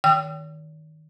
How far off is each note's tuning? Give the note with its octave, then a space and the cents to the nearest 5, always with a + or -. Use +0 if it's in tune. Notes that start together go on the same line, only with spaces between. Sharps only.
D#3 +0 G5 +0 E6 +45